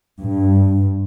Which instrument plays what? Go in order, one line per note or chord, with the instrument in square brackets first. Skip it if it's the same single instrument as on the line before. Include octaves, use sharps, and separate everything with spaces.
[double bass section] G2